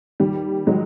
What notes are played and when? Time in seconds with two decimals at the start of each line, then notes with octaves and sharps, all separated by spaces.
0.20 D#2 G3
0.67 D#3 F#3 G#3